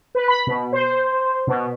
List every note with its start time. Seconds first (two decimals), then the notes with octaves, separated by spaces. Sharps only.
0.15 B4
0.28 B5
0.47 B2
0.73 C5
1.47 B2